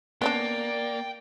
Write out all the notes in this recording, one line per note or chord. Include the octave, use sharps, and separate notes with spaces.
A#3 B3 C#4 D4 D5 G5